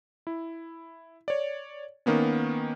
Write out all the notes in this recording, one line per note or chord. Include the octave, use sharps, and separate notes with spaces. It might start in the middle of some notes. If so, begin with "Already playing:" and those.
E4
C#5 D5
D#3 A#3 B3 C#4